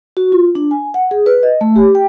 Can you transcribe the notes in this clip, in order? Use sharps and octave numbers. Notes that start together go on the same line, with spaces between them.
F#4
F4
D4
G#5
F#5
G#4
B4
D#5
A3
G4
G5